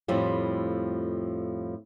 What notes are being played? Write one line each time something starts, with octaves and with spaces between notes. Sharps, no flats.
F2 A2 F3 G3